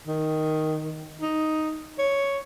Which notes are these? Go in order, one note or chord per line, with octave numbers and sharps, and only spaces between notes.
D#3
D#4
C#5